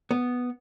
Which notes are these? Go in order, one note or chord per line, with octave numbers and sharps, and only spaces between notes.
B3